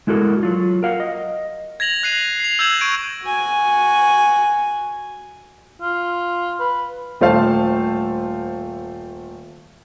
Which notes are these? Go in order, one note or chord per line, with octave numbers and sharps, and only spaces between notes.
G#3 E4 F#4 A4 A#4
F#3 F4
A#4 F5 F#5
D#5
G#6 A#6 F7 F#7
F#6 C7 D#7 F7 F#7
C7
C7 F7
E6 G6 G#6 E7 F#7
C#6 G#6 D7 D#7
F#4 G#5
F4
B4
D#1 A3 C5 F5 A5